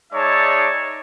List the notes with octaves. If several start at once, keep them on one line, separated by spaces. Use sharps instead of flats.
G#3 D#4 C#5 D5 E5 A5